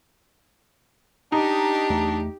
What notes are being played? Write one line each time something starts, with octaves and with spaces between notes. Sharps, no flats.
D4 D#4 G4
E2 A3